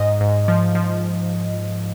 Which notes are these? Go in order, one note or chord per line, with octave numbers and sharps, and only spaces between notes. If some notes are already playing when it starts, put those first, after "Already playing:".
Already playing: G#2 D#5
G#2
F3
F3